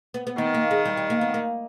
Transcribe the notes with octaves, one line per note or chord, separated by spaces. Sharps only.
B3
B3
D#3 B3
A#3
G#3
G3
G3
A#3
B3
A#3